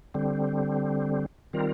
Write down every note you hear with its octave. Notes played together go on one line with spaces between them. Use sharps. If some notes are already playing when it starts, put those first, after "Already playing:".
D3 G3 C4
D#3 G3 C4 F4 A#4